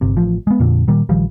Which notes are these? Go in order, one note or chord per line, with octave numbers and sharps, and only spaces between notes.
G1 C3
A1 F3
G#3 B3
F2 A#2 D3
A#2 D#3 G3 A#3
A#1 D#3 F3 G3